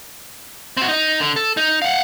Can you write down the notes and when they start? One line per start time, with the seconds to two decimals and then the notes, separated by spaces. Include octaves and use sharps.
0.77 C4 F#4
0.88 D#4 D#5
1.20 D3
1.36 A4
1.57 D#4
1.82 F5 F#5